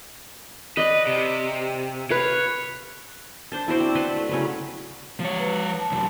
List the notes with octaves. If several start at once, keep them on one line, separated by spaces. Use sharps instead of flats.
B4 D5 D#5
C3
B4 C#5 F5
D4 C5 A5
E4 F#4 C5 D5
C4
B4 F#5 A5 C6
A3
C#3 F#3 B4
F3 C#5
B4
A5
C2 F#2